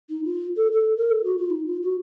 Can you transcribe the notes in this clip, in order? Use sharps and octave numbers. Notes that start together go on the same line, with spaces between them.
D#4
F4
A4
A4
A#4
A4
F#4
F4
D#4
F4
F#4